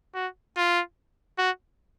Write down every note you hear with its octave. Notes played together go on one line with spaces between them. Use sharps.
F#4
F4
F#4